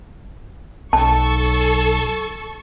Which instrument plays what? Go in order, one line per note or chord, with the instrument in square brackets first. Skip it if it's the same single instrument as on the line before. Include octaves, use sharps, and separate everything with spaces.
[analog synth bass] B1 [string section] A4 C#6 [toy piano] A5